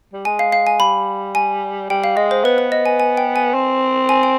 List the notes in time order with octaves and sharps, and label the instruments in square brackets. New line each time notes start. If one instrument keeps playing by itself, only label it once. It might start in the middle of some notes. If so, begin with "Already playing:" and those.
[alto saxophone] G3
[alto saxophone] G#3 [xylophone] G#5
[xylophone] F5
F5
G#5
[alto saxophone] G3 [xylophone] B5
[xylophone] G#5
[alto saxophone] G3 [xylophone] G5
[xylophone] F5
[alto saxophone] G#3 [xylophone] D#5
[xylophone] C5
[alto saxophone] B3 [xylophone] B4
[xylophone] B4
D#5
G#5
G#5
G5
G#5
[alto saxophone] C4
[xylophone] G#5
G5